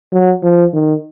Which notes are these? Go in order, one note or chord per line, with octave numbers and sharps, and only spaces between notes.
F#3
F3
D#3